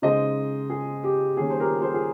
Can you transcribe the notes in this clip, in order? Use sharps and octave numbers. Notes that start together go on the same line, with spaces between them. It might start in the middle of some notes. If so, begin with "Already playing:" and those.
C#3 G#3 D#4 C5 D#5
G#4
G4
D#3 G3 A#3 C#4 G#4
C5
G4 A#4
G#4 C5
G#4